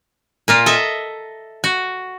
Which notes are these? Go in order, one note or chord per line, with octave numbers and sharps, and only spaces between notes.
A#2 A#3 F4
A4 D#5 E5
F#4